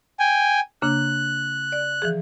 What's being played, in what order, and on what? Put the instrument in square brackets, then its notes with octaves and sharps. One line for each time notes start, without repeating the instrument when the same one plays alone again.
[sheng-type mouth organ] G5 G#5
[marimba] C#3 A#3 D4 [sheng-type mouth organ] F#6
[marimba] D5
E3 F3 G#4